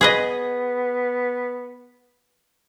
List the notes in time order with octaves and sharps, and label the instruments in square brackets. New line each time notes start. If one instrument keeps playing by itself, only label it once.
[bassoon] B3 [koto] G#4 B4 D#5